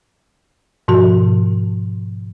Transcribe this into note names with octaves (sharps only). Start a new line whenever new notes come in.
G#2 B2 F3 F#4